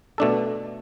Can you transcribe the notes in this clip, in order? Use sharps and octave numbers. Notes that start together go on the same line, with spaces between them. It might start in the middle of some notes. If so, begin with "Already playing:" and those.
B2 A3 D4 A4